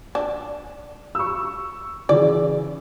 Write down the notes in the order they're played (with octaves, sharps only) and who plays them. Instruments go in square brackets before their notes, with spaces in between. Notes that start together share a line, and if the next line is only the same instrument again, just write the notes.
[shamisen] D4
[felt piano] C#6 E6
[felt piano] C#3 E3 [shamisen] D5